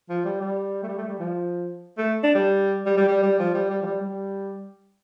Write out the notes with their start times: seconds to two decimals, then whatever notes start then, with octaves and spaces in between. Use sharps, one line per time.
0.09 F3
0.25 G3
0.41 G3
0.83 A3
0.88 G3
0.98 A3
1.08 G3
1.19 F3
1.98 A3
2.23 D4
2.35 G3
2.86 G3
2.97 G3
3.08 G3
3.23 G3
3.40 F3
3.54 G3
3.70 G3
3.82 F3
3.86 G3
4.01 G3